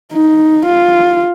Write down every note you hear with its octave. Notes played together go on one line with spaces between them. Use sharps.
D#4
F4